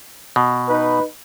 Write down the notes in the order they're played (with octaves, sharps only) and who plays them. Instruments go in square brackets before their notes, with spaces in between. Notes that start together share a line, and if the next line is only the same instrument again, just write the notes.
[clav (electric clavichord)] B2
[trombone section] D#4 B4